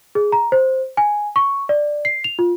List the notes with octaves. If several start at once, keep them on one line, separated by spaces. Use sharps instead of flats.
G#4
A#5
C5
G#5
C#6
D5
C7
F7
F4